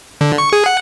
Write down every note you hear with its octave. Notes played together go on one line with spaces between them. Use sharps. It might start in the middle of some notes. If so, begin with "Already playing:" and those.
D3
C#6
G#4
F#5